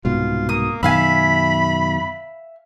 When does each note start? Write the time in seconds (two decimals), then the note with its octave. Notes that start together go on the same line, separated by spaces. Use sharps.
0.05 C2 G#2 B2 F4
0.49 A#3 D#6
0.83 F#2 B2 D#3 E5 F5 G#5 B5